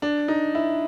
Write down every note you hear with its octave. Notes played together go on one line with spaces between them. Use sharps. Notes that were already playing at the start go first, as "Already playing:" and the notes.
D4
D#4
E4